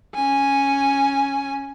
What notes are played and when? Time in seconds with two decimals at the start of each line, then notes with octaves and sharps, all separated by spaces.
0.15 C#4 G#5